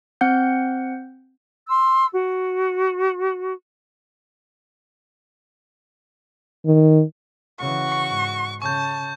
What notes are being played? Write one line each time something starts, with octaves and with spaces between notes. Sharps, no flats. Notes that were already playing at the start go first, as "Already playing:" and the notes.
C4 F#5 G6
C6 E6
F#4
D#3
C#3 E3 F#4 C#6
G#2
C#3 A5 C#6 G6